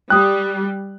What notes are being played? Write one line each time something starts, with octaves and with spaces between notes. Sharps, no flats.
G3 G5 D#6 F#6